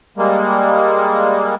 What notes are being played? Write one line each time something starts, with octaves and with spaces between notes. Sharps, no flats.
G3 G#3 A#3